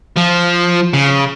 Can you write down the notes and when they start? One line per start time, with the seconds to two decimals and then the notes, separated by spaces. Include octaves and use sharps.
0.16 F3
0.93 C#3